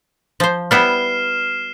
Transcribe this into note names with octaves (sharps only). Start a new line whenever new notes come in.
F3 C5
G3 B3 E4 F6 C7 E7